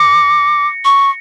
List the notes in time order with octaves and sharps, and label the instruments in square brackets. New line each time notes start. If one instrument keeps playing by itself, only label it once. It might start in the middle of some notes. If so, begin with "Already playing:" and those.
Already playing: [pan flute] D6 [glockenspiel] A#6 C#7
[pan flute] C#6